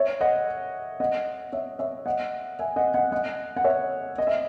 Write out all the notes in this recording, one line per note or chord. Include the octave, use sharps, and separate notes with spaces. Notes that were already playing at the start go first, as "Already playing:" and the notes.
Already playing: C#5 E5
D#5 F#5
D#5 F#5
C#5 E5
C#5 E5
D#5 F#5
E5 G#5
D#5 F#5
D#5 F#5
D#5 F#5
F#5
C#5 E5
D#5
E5